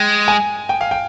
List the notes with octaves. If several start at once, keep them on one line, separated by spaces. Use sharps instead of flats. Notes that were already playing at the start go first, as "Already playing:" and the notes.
Already playing: G#3 G5
G#5
G5
F5
G5